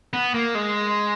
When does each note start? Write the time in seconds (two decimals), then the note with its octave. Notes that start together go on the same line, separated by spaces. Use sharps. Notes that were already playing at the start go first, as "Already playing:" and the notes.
0.13 B3
0.34 A#3
0.55 G#3